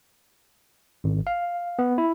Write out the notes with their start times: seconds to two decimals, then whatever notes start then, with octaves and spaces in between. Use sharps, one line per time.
1.04 G#1
1.27 F5
1.79 B3
1.98 E4